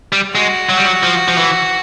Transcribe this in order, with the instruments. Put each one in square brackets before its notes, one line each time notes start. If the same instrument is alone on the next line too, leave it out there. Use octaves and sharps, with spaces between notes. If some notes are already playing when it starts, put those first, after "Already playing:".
[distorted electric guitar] G3
[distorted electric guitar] G#3 [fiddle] F#4
[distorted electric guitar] F#3
G3
F#3
F3
F3
E3